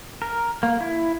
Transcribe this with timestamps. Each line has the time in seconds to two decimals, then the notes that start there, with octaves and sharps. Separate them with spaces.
0.22 A#4
0.63 A#3
0.81 E4